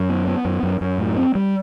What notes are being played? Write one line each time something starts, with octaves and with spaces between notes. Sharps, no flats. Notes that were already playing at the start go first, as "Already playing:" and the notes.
Already playing: F#2
B3
B3
F#2
F#2
F#2
A2
C4
G3